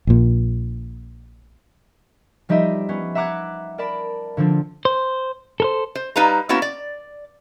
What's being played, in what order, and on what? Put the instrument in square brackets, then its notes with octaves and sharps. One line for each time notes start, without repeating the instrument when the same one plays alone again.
[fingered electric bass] A#1 A#2
[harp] F3 G3 D#4 G4 D#5 E5
B3 C#4
E5 F#5 A#5 D6 F#6 G#6
A#4 D5 A5 B5
D3 F3 C4 D4
[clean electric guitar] C5
A4 A#4 C5
[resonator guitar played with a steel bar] C5
G3 D#4 B4 F5 A#5
A#3 B3 C#4 E4 F#4
D5